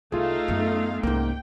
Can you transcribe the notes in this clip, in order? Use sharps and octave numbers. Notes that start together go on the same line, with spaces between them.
C2 A3 D#4 F4 G#4 F5
F#2 B3
C2 G#2 A#3 C#4 G5